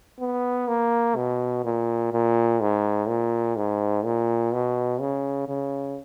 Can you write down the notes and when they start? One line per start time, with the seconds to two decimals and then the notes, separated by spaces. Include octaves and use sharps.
0.20 B3
0.68 A#3
1.16 B2
1.65 A#2
2.13 A#2
2.61 G#2
3.09 A#2
3.57 G#2
4.05 A#2
4.53 B2
5.01 C#3
5.48 C#3